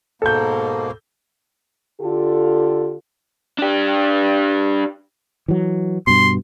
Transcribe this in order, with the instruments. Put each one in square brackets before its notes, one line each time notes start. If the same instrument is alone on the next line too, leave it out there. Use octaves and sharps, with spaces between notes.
[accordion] G#2 B2 A#3 [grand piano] A4 G6
[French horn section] D3 F4 G4 A4
[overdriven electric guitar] D4 G4
[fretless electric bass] E3 F#3
[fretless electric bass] G2 B2 [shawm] C6